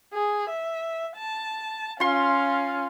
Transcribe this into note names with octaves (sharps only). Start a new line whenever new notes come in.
G#4
E5
A5
C#4 F4 F5 C6